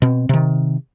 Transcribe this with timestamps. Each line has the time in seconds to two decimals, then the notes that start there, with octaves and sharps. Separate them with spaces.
0.02 B2 C4
0.29 C3 D#3